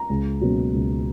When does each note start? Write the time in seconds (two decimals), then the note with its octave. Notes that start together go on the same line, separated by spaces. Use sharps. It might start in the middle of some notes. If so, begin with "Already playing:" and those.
Already playing: A#5
0.10 C#2
0.41 B2 F#3 A#3 C#4
0.73 C#2